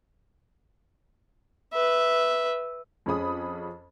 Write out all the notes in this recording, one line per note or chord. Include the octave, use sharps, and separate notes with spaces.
B4 E5
F2 C#4 G#4 B5 D#6